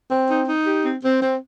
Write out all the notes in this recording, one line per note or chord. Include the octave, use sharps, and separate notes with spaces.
C4
D#4
D#4
G4
C4
C4
C4